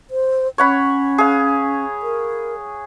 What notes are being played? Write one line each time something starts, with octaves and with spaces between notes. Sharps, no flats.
C5
C#4 C#5 F#5 B5
G#4 F5
A#4